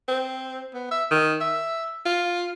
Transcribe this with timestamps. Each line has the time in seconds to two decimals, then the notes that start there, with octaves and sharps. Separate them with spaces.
0.08 C4
0.74 B3
0.91 E5
1.11 D#3
1.41 E5
2.05 F4